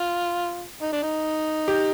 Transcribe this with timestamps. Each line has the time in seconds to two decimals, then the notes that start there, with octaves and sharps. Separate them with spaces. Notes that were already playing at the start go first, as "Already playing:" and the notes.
Already playing: F4
0.82 D#4
0.92 D4
1.03 D#4
1.68 G4